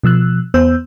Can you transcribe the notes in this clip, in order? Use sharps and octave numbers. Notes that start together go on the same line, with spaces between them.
B2 F3 E6 F#6
E2 B3 C5 E6 G6